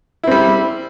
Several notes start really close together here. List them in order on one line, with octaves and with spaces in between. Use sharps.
E4 C4 G3